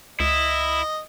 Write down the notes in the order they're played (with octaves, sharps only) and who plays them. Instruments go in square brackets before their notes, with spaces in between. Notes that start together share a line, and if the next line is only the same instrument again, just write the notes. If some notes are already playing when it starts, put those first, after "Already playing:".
[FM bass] C#2 [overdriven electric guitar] E4 [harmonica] D#5